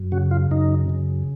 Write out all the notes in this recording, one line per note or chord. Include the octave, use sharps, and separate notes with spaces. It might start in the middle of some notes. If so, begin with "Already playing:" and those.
Already playing: F#2
C#3 F#4
F4
F#2 D#4
C#3